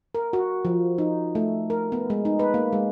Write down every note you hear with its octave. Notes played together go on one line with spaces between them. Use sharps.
A#4
F#4
F3
D#4
A3
A#4
B3
G#3
D#4
B4
A#3
G#3